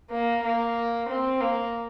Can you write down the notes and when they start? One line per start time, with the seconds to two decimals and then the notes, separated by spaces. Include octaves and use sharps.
0.11 A#3
0.44 A#3
1.09 C4
1.41 A#3